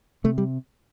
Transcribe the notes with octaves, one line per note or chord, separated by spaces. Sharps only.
C3 A3
G3